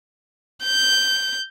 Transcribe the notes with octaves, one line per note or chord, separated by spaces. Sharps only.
G6